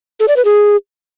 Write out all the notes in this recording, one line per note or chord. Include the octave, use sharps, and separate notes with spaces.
A4
D5
B4
G#4